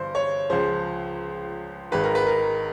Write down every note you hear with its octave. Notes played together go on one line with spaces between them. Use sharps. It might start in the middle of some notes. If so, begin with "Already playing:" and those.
Already playing: G1 G2 E3 C5
C#5
C#2 C#3 F3 C5
G#1 G#2 D#3 B4
A#4
B4
A#4